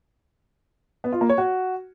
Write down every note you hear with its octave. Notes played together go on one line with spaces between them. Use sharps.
B3
F4
A#3
C#5
F#4